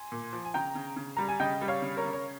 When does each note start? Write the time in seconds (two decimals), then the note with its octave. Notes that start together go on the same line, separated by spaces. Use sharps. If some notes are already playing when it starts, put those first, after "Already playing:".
Already playing: G#5 C6
0.12 A#2
0.33 F3
0.45 G#5
0.54 C#3 G5 A#5
0.75 C#3
0.96 C#3
1.17 G3 A#5
1.28 G#5
1.40 C#3 D#5 G5
1.61 G3
1.68 C#5 F5
1.82 C#3
1.97 A#4 C#5
2.04 C#3
2.13 C#5